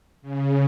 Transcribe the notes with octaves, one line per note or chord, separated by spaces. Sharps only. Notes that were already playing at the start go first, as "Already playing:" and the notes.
C#3